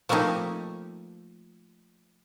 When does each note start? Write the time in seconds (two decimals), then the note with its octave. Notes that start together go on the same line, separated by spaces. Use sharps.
0.09 F3 A3 A#3 C4 D#4 G4